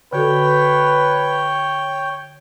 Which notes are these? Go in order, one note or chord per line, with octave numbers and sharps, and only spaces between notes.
D3 F#4 A4 B4 C#5 G5